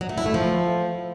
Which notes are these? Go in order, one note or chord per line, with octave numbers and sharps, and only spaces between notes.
F#3
A3
E4
A3
F3